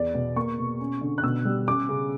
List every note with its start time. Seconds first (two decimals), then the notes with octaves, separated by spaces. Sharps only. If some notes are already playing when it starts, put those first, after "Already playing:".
Already playing: E2 D5
0.14 B2
0.36 A#3 C#6
0.58 B2
0.80 C#4
1.01 D3
1.18 F#6
1.23 B2 E6
1.45 G3
1.67 C#4 D6
1.89 C#3